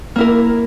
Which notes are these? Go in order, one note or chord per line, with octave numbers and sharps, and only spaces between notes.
A#3 E4 A#4